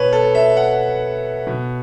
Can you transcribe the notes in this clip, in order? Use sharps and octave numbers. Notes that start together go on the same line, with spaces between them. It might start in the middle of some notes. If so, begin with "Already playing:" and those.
Already playing: B2 B4 C#5
A4
E5
F#5
B2